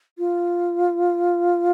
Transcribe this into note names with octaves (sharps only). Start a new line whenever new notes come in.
F4